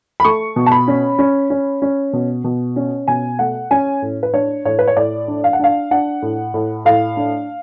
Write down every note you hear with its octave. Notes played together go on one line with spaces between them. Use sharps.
B5
A3 C#6
B2
A5
B5
C#4
C#4
C#4
C#4
B2
B2
C#4
B2 G#5
A3 F#5
C#4 G#5
A2
B4
D4 C#5
A2 C#5
B4
C#5
A2 D5
D4
F5
F#5
D4 F5
D4 F#5
A2
A2
A2 F5
D4